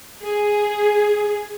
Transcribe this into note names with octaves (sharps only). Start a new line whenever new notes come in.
G#4